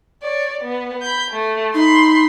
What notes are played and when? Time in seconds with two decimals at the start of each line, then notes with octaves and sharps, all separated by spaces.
0.22 C#5 D5
0.62 B3
1.02 B5 G6
1.31 A3
1.75 D#4 B5 C6